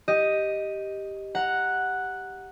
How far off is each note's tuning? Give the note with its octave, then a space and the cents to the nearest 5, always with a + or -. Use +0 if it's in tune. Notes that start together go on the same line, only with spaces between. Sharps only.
G4 +0 D#5 +0
F#5 +0 A#5 +0